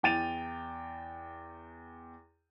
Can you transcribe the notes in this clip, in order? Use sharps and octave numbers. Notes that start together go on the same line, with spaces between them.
E2 G5 A6 D#7 F7